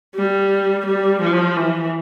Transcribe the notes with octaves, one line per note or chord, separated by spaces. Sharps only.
G3
G3
F3
E3